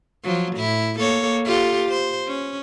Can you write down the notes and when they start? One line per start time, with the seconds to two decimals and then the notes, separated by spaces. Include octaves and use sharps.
0.24 F3 F#3
0.56 A2 E4
0.99 A#3 A4 C#5
1.45 F4 G4 A4
1.89 C5
2.27 C#4